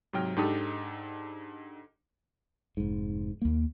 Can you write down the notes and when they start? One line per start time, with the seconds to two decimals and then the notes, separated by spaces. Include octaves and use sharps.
0.13 G#2 C3 F#3 G5 F6
0.36 G#2 D4 D#4 G4 A4 D#6
2.77 F1 G#2
3.42 D#2 A#3